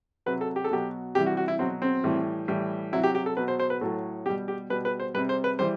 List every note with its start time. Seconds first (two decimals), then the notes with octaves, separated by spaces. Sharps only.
0.26 C3 F#3 B4
0.41 A4
0.56 G4
0.64 A4
0.71 B2 F#3 G4
1.15 C3 E3 G3 G4
1.26 F#4
1.37 F#4
1.48 E4
1.59 B2 F#3 C4
1.82 C4
2.04 A2 E3 G3
2.48 A2 E3 G3
2.93 C3 F#3 E4
3.04 G4
3.15 G4
3.26 A4
3.37 B2 F#3 B4
3.48 C5
3.60 C5
3.70 B4
3.81 A2 F#3 A4
4.26 B2 G4
4.29 G3
4.48 G4
4.70 B2 G3 B4
4.85 B4
5.00 C5
5.14 G3 B4
5.18 C3
5.29 C5
5.44 B4
5.59 E3 G3 C5